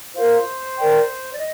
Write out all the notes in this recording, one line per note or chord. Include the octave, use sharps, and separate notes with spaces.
F4 A#4 C5 F5
A#4 D5 G5
D5
D#5